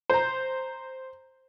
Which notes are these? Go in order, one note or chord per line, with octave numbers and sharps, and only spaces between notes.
C5 A#5